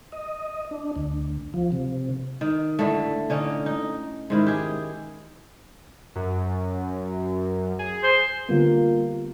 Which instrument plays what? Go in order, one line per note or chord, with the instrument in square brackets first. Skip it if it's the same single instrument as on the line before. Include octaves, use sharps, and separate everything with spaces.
[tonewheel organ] D#5
D4
D2
F3
C3
[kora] D#3
A2 D3 A3
D3 C#4 D#4
D#4
G#2 D#3 E4
G4 G#4
[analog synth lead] F#2
G#4
[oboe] C5
[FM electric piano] D3 G3 B3 [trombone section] A#3 F4